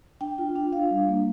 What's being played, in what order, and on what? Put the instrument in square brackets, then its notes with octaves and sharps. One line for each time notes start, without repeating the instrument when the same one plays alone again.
[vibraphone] D4 G5
F4
D4
D4 F5
G3
A#3